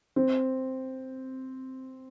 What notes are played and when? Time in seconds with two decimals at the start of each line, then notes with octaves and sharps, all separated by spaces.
0.16 C4